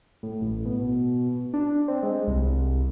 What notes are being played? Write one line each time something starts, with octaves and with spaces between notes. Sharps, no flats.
A2
A1
B2
D4
C4
G#3
C2